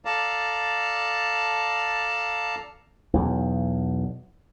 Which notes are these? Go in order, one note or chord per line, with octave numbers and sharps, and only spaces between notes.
A4 D5 F5 A5 A#5
B1 E2